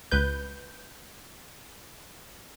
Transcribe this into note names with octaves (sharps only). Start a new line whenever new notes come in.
C#2 B4 G6